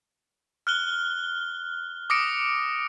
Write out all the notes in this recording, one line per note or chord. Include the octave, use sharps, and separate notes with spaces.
F6 F#6 G7
D6 D#6 A#6 C#7 D7